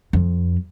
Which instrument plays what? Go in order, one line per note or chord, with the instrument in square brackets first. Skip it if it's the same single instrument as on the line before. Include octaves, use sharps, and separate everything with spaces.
[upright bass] F2